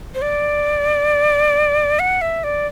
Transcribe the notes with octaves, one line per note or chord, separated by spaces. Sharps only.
C5
D5
F#5
E5
D5